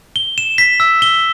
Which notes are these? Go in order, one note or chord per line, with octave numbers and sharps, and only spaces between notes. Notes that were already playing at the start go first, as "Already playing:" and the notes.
G7
E7
B6
E6
G7